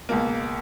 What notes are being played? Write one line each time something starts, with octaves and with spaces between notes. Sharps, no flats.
C#2 B2 A#3